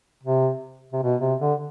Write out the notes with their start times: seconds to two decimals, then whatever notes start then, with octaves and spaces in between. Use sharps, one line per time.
0.23 C3
0.93 C3
1.02 B2
1.21 C3
1.40 D3